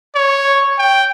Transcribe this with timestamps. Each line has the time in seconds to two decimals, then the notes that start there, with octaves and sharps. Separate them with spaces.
0.15 C#5
0.79 G5